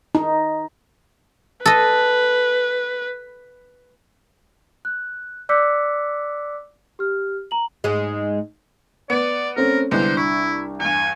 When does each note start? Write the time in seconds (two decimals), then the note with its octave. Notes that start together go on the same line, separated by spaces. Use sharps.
0.15 D#4
1.66 A4 B4 D#5
4.85 F#6
5.49 D5 D6 E6 F#6 B6 C#7
6.99 G4 F6
7.51 A#5 F#7
7.84 G#2 G#3
9.10 B3 D5
9.56 A3 C4 C#4 A#4
9.91 C2 D3 G#3 B3 D4 C5
10.17 E4 C#6
10.80 E2 G2 G#5